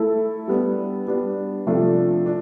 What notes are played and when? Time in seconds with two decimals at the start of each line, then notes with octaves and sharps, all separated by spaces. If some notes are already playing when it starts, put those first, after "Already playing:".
Already playing: A3 E4 A4 E5
0.48 G3 B3 D4
1.07 G3 B3 D4
1.67 C3 F3 A3 D4
2.26 D4